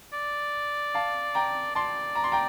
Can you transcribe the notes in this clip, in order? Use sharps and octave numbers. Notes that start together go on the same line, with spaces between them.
D5
F5 A5
G5 A#5
D5 A5 C6
A#5
C6
G5 A#5